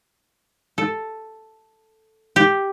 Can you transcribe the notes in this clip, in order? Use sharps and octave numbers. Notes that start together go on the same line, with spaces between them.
A4
G4